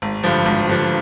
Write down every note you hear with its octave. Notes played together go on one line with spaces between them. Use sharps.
G#1
G2 D3 F3
G#1
G2 D3 F3